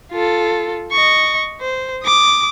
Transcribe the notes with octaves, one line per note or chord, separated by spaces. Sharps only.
F4 A4
D#5 C#6
C5
D6 D#6